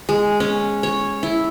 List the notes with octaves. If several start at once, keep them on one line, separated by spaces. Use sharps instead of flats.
G#3
C#4
C#5
E4